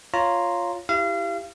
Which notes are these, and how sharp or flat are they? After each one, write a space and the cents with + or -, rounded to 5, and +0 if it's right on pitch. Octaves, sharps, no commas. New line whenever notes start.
F4 +0 C#5 +0 A#5 +0
E4 -5 G4 +0 F5 -35